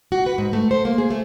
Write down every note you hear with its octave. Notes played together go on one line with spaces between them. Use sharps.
F#4
B4
G#2
A3
C5
A#3
G#4
A3